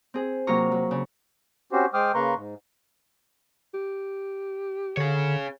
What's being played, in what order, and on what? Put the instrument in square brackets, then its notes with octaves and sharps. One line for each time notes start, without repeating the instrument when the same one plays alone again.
[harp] C4 G#4
C3 F#3 A#3 F4 A#5 C#6
F#3
C#3
[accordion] C4 C#4 F#4 G4 C5
G#3 C5 G5 D6 D#6 F6
C#3 A#3 B4 A#5 C6 C#6
G#2
[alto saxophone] G4
[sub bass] D3 [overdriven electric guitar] G#4 C#5